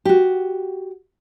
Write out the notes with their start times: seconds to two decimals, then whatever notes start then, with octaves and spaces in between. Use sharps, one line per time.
0.05 F#4 G4